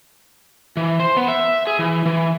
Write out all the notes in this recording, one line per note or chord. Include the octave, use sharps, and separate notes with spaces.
E3
C5
B3
E5
G#4
E3
E3